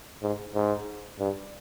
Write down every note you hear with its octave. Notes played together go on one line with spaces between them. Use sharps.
G#2
G#2
G2